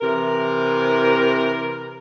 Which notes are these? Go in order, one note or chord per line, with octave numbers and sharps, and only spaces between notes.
C3 E3 A#4